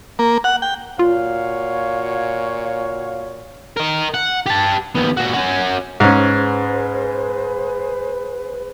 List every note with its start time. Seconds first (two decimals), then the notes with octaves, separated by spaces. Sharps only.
0.19 A#3
0.44 F#5
0.62 G5
0.99 A#2 F4 F#4 C#5 F5
3.77 A#4 D#5
4.14 F#5
4.46 G4 A5
4.95 D#2 B3
5.17 A#2 F#4
5.34 C#4 F#4
6.00 G#2 C#4 G#4 B4 C5